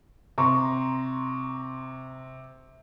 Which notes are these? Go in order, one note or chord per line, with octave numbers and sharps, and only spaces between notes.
C3 A#5 C6 C#6